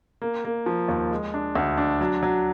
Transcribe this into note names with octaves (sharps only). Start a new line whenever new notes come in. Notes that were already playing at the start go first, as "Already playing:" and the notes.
A#3
A#3
F3
D#2
G#3
D4
D2
D4
F#3
F#3